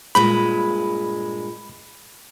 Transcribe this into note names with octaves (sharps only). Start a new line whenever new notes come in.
G2 A#2 G#3 B5